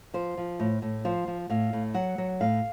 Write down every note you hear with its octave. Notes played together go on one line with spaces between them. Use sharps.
F3 C5
F3
A2
A2
F3 C5
F3
A2 F5
A2
F#3 F#5
F#3
A2 F5